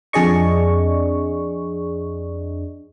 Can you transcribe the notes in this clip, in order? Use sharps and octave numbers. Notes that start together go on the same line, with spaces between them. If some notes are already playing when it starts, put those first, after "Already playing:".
F2 D4 G#4 D5 D#5 C#6